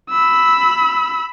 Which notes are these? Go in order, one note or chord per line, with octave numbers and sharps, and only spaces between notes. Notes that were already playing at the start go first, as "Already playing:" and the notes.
B5 E6